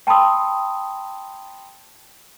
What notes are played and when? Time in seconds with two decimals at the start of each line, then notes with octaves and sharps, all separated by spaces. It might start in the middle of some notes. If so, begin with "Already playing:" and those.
0.07 G5 A5 B5 C6 D#6 E6